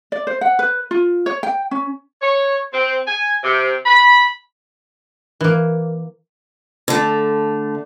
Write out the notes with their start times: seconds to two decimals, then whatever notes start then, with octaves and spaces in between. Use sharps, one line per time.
0.12 D5
0.27 C5
0.41 F#5
0.59 B4
0.91 F4
1.26 C#5
1.43 G5
1.71 C#4
2.22 C#5
2.72 C4
3.06 G#5
3.43 C3
3.86 B5
5.41 E3 A#3
6.88 D3 A3